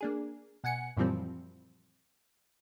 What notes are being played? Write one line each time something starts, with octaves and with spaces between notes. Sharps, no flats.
A#3 D4 G#4
B2 F#5 G#5 C#7
F#2 A#2 E3 F3 G3 C4